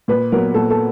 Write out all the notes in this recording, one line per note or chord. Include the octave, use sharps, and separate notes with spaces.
A#2 B4
F#3 B3 A#4
A#2 A4
A4